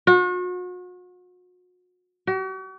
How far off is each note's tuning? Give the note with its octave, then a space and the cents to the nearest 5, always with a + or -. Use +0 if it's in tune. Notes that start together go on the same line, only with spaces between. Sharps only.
F#4 -40
F#4 +45